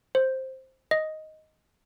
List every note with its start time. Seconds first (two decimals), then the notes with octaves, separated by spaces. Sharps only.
0.15 C5
0.91 D#5